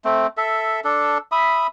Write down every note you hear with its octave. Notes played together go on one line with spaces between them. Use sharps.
A3 C4
A4 E5
D4 A4
E5 B5 D#6